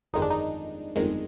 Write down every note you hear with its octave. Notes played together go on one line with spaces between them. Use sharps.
G1 F2 D#3 G#3 D#4
D4
D#4
G1 F2 D#3 G#3